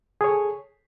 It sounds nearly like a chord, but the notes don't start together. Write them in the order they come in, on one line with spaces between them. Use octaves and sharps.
G#4 C#5 A4